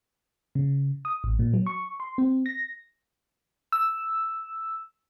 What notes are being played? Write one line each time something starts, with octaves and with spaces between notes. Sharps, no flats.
C#3
D#6
A1
A#2
F#3
C#6
C6
C4
A#6
E6